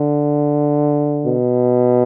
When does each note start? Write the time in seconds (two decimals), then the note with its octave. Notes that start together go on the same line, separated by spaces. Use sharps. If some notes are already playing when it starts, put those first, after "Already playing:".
Already playing: D3
1.26 B2